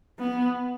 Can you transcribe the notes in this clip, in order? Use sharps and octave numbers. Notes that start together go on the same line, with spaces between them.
B3